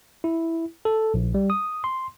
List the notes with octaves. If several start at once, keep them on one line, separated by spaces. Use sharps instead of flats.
E4
A4
A#1
G3
D#6
C6